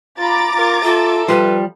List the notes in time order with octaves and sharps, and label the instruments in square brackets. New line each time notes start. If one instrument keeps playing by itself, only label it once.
[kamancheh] F4 B5 [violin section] A#5 D6 A6
[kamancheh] F4 A#4
[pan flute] F4 [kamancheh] A4 E5
[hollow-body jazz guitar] F3 G3 [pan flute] B4